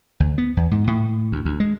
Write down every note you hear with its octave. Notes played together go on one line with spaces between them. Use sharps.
D2
B3
E2
G#2
A2
D2
D2
G#3